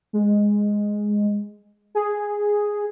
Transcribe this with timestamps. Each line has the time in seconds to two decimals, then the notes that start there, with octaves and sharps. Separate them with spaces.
0.13 G#3
1.95 G#4